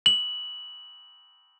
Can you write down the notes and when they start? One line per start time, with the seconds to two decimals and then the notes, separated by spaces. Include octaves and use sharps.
0.06 F#7